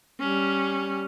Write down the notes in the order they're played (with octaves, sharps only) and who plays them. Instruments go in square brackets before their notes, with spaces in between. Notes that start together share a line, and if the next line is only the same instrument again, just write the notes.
[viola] G3 C#4